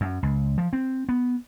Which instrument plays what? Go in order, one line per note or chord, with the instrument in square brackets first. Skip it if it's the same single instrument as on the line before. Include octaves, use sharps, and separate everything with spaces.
[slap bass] F#2
C#2
F3
C4
B3